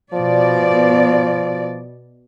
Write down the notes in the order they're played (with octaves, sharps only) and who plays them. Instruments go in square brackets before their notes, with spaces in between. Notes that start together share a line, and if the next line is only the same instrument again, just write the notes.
[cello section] B2 D5 [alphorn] F3